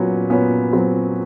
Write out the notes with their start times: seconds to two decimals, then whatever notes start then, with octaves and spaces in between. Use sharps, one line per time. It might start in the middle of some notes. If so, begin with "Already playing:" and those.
Already playing: A#2 F#3 B3 C#4
0.30 A#2 B3 C#4
0.73 F#3 C4